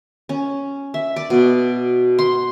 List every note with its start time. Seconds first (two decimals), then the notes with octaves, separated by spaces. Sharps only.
0.29 C#4
0.94 E5
1.16 D5
1.30 B2
2.19 C6